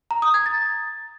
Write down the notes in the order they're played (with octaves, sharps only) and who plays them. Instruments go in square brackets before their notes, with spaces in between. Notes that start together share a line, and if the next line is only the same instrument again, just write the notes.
[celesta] A#5
D#6
G#6
A6